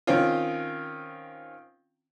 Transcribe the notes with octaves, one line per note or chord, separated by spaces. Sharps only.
D#3 C4 C#4 F4